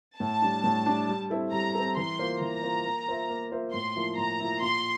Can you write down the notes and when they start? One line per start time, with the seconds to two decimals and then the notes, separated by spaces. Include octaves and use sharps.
0.20 A2 A5
0.42 G3 D4
0.64 A2
0.86 G3 D4
1.08 G3
1.30 C4 E4 A4
1.52 G3 A#5
1.75 C4 E4 A4
1.97 E3 C6
2.19 A#3 F4 C5
2.41 E3 A#5
2.63 A#3 F4 C5
2.85 A#3
3.07 F4 C5 E5
3.29 A#3
3.52 F4 C5 E5
3.73 A2 C6
3.96 F3 A#3 E4
4.18 A2 A#5
4.40 F3 A#3 E4
4.62 A#2 C6